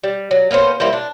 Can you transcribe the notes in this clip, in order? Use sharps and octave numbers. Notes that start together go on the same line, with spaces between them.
G3
F#3
A#3 B3 C#4 C5
G3 A#3 E4 C5
D4